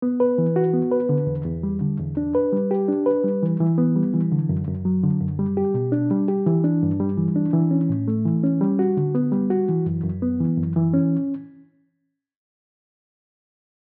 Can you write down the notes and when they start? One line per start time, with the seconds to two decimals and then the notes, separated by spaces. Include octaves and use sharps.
0.02 B3
0.20 B4
0.38 E3
0.56 F#4
0.74 B3
0.91 B4
1.09 D3
1.27 E2
1.45 E2
1.63 G3
1.81 D3
1.99 E2
2.17 D4
2.35 B4
2.53 G3
2.71 G4
2.88 D4
3.06 B4
3.24 G3
3.43 E3
3.60 E3
3.78 B3
3.96 G3
4.14 E3
4.32 D3
4.49 F#2
4.67 F#2
4.85 F#3
5.03 D3
5.21 F#2
5.39 G3
5.57 G4
5.74 B2
5.92 D4
6.11 G3
6.28 G4
6.46 E3
6.64 D4
6.83 G2
7.00 G3
7.18 E3
7.36 D4
7.53 E3
7.71 C#4
7.89 A2
8.08 A3
8.25 E3
8.44 C#4
8.61 G3
8.79 F#4
8.97 D3
9.15 B3
9.32 G3
9.50 F#4
9.69 E3
9.86 F#2
10.04 F#2
10.22 B3
10.40 E3
10.58 F#2
10.76 E3
10.94 C#4